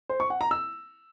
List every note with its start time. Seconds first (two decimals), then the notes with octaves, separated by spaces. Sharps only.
0.09 C5
0.20 C#6
0.30 F#5
0.41 A#5
0.51 E6